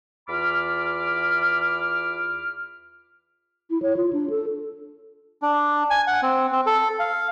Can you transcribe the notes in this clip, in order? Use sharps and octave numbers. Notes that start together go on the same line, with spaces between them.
E2 F4 B5 D6 F6
E4
C#5
F4
D4
A4
D4
G#5
F#5
C4
C4
A4
F5